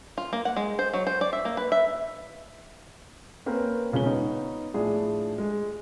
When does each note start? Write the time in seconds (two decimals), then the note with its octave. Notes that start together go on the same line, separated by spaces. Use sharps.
0.18 F4
0.33 A#3
0.45 F#5
0.57 G#3
0.79 C5
0.94 F#3
1.07 C5
1.21 D5
1.33 E5
1.45 A#3
1.57 B4
1.72 E5
3.46 A#3 C4 C#4 A#4 B4
3.92 E1 C#3 F3 C#4 G7
4.05 B3 C#4 D#4
4.74 A2 F3 D4 G#4
5.38 G#3